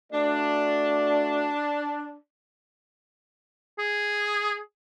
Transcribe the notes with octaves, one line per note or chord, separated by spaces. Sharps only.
A3 D4 F#4 D5
G#4